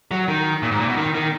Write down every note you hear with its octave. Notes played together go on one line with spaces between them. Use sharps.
F#3
D#3
A#2
G#2
A#2
B2
D#3
D#3